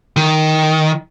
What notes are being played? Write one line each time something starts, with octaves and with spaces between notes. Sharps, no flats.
D#3